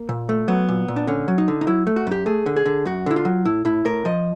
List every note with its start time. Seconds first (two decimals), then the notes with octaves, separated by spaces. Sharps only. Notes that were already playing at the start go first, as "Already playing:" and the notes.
Already playing: A#3
0.09 A#2
0.29 A3
0.48 F#3 B3
0.68 A#2
0.88 A#2
0.96 D4
1.07 D3 C#4
1.28 F#3
1.38 D#4
1.48 D3
1.61 D#4
1.67 F#3 E4
1.87 A3
1.96 F#4
2.07 F#2 G4
2.26 A3 G#4
2.46 D3
2.56 G#4
2.66 D3
2.85 F#2 F#4
3.06 D3 E4
3.16 F4
3.25 F#3
3.45 A2 E4
3.65 A2 E4
3.85 A2 A#4
4.05 F3 D#5